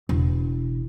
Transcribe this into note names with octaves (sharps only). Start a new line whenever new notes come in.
E1